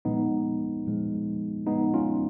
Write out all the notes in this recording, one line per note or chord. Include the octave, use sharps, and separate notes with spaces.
A#2 F3 G#3 B3 D#4
A#2 F3 G#3
A#2 F3 G#3 B3 D#4
C#4 F4